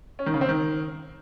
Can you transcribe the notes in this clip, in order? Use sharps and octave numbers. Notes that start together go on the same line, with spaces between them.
C#4
D#3
C#3
C4
D#3